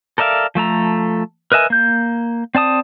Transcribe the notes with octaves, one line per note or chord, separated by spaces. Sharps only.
A4 A#4 D5 E5 F5
F3 A3 A4 A#5
A#4 B4 D#5 E5 G#5
A#3 G6
C4 D5 A5 D#6